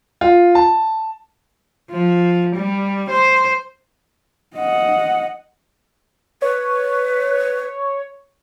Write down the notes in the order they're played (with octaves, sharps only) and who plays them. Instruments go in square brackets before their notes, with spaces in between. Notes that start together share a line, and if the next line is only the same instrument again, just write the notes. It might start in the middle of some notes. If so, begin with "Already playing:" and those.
[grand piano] F4
A5
[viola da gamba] F3
G3
C5
[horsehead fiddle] D#5 F#5
[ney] B4 [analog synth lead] C#5